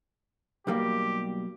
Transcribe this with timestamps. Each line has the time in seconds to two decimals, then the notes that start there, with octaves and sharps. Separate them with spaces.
0.67 B1 G3 A#3 G4